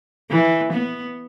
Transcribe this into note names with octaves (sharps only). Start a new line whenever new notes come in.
E3
B3